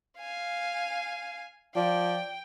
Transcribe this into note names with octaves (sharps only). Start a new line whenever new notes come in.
F5 G#5
F3 D5 G5